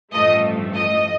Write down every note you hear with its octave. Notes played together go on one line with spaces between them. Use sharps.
A1 G2 F3 A3 D#5
D#5